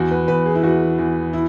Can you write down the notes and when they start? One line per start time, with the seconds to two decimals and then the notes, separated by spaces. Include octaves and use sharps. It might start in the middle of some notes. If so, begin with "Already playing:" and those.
Already playing: E2 F#4
0.11 B4
0.28 E2 B4
0.46 G#4
0.55 E4
0.63 E2 F#4
0.99 E2
1.33 E4